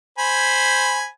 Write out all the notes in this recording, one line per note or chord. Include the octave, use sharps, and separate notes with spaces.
C5 G#5 B5